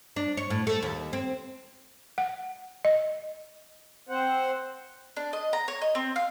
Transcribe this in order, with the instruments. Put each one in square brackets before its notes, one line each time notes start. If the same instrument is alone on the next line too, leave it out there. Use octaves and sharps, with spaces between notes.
[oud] D4
C#5
A2
A3
D#2
C4
[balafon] F#5
D#5
[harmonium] C4 C5 F#5
[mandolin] D4
D#5
A#5
C#5
D#5
C4
F5